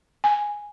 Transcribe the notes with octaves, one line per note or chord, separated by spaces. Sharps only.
G#5